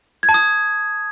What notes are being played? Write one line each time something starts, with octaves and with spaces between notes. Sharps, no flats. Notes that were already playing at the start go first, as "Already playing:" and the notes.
G#6
A5
D#6